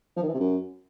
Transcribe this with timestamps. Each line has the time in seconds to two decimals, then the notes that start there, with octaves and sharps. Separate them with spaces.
0.17 F3
0.22 D#3
0.28 E3
0.34 C3
0.40 F#2